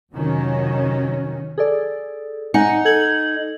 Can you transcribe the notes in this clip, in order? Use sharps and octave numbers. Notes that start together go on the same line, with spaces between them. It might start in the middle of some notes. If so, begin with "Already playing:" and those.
F2 C3 D#3 F#3 C#4
G#4 A4 D5
D#4 F#5 G#5 C#7
A4 G#6 F#7